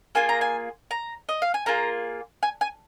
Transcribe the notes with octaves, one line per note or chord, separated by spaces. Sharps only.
A#3 F4 G#4 G#5
A#5
G#5
A#5
D#5
F5
G#5
A#3 F4 G#4 A#5
G#5
G#5